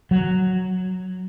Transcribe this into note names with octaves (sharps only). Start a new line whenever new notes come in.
F#3